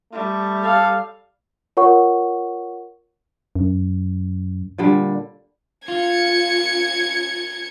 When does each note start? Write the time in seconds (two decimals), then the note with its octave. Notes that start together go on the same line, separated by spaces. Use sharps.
0.13 G3 A3
0.64 A4 F5
1.77 F4 A#4 C#5 F#5 C#6
3.56 F#2
4.78 A#2 D3 G3
5.88 F4 G#6 C#7